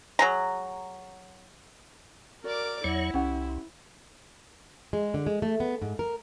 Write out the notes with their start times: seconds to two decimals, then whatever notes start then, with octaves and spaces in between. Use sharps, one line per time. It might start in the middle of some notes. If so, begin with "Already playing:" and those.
0.19 F#3 G#4 A#5
2.44 F#4 A#4 D5 D6
2.84 E2 F#3 E4 C#5 F#5
3.14 C2 C#4 G4 F#5
4.93 G#3
5.14 D3
5.26 G#3
5.42 A3
5.60 B3
5.82 G#2
5.99 A#4